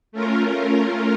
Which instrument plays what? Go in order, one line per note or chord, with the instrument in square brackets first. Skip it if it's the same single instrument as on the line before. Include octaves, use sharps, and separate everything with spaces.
[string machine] A3 C#4 F4 A#4